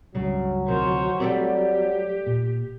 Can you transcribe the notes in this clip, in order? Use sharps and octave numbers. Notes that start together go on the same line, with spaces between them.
C#2 G2 C#3 F#3
D2 C3 D#3 F3 C5 C#5
G3 A3 C4 G4 D5
A#2